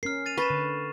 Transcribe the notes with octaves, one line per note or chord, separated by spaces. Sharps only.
C#4 A#4 F6 C7
A6 D#7 F7
B4 C#6 A6 E7
D3